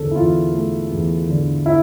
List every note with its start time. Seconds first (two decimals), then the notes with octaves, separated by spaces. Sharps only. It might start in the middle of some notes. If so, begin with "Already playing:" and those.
Already playing: E2 D3 A4
0.11 E4
0.15 E2 F4
0.53 A3
0.91 E2
1.29 D3
1.66 E4